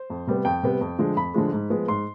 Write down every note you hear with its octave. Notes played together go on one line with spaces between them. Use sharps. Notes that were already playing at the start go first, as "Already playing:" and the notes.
Already playing: C5
F2
C3 G3 B3
F2 G5
C3 G3 B3
F2
D3 F3 G#3
F2 B5
D3 F3 G#3
G#2
F3 G#3 B3
G#2 C6